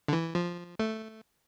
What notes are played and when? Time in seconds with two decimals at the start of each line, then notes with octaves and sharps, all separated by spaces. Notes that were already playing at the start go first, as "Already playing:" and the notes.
0.08 D3
0.13 E3
0.35 F3
0.79 A3